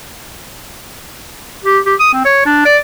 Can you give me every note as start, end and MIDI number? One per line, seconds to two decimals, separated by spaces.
1.64 1.79 67
1.86 1.94 67
2.00 2.12 87
2.13 2.22 60
2.25 2.41 73
2.46 2.61 62
2.65 2.77 74